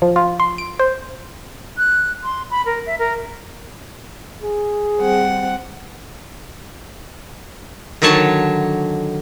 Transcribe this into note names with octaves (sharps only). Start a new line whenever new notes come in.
F3
F4
C6
D7
C5
F#6
C6
B5
A#4
E5
A#4
G#4
G3 C4 F#5
D3 D#3 F#3 C#5 A5